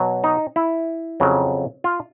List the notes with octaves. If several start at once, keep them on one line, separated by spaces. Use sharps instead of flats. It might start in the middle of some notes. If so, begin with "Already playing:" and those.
Already playing: B2 F#3
D#4
E4
F2 C#3 F#3
F4